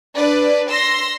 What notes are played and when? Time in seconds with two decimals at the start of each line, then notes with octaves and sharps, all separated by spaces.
0.15 D4 B4 D5
0.69 C6 E6 A#6